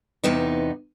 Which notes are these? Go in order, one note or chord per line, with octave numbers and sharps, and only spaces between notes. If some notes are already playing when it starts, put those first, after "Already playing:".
E2 C3 B3 D#4